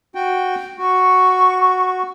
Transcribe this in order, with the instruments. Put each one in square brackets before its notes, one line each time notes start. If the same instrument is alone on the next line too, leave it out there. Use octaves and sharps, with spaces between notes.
[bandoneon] F#4 G5
[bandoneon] F#4 [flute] C#6